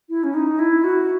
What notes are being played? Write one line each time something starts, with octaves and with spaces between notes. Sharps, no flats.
E4
C#4
D#4
E4
F#4